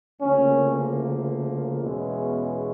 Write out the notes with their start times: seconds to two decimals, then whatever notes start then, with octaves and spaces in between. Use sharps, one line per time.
0.21 D2 C#3 F3 A#3 C#4
1.82 E2 B2 G#3 C#4 E4